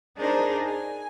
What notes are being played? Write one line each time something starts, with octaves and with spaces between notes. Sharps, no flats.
D4 D#4 G#4 A#4 C5
G#5